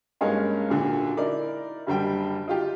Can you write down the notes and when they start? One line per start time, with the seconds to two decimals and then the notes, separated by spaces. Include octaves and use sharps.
0.21 G2 G#3 A#3 C#4 D#4
0.69 D#1 A#2 D3 F#4
1.17 D#4 E4 A#4 D5
1.87 F#1 D3 G3 G5
2.48 D#4 F4 G4